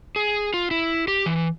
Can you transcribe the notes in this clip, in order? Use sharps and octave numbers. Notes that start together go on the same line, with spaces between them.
G#4
F4
E4
G4
E3